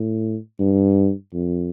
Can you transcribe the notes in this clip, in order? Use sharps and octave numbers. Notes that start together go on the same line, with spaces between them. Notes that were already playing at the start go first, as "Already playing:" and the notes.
Already playing: A2
G2
F2